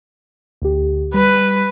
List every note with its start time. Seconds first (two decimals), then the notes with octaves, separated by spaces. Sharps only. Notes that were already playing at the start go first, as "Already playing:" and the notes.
0.62 D2 G4
1.14 G3 B4